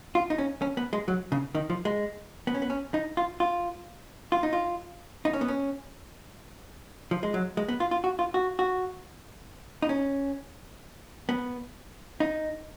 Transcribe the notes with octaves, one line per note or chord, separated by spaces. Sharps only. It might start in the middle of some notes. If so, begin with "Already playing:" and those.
F4
D#4
C#4
C#4
B3
G#3
F#3
C#3
D#3
F3
G#3
B3
C#4
B3
C#4
D#4
F4
F4
F4
D#4
F4
D#4
C#4
B3
C#4
F3
G#3
F#3
G#3
B3
F4
F4
F#4
F4
F#4
F#4
D#4
C#4
B3
D#4